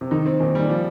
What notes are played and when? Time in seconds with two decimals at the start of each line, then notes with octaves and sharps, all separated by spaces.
0.01 C3
0.11 D#3 D#4
0.26 C4
0.40 A#2 D#3
0.55 D#3 G3
0.69 F3 G3